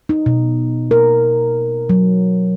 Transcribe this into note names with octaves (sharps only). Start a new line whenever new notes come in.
D#4
B2
A#4
F#3